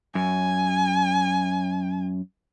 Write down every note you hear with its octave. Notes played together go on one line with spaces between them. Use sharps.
F#2 G#5